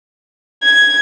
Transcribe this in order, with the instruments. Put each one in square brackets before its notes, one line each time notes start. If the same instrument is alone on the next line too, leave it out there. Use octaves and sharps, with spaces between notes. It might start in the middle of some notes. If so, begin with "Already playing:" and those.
[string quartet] G#6